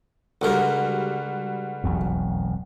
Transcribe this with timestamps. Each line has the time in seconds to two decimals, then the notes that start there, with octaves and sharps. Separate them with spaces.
0.41 C#2 D3 G3 F#4 A#4
1.84 E1 B1 F2